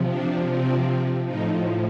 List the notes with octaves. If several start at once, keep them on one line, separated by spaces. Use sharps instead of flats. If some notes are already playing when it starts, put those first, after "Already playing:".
Already playing: C3 F3
D4
C4
A2 F3 D#4